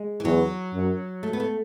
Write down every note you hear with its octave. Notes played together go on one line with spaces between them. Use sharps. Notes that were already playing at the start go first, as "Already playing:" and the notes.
Already playing: G#3
E3
E2 F#3
F#2
A3
B3
A3